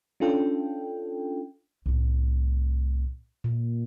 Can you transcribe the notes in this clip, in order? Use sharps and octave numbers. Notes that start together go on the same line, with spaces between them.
C#4 D4 F4 A4 G5
C2 A2
A#2